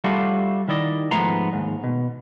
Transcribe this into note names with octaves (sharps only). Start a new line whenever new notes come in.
G3 A3 D4 F4 F#4
D#3 E4 D5 D#5
G#2 F3 A3 B3 A#5 C6
D#2 G#2
B2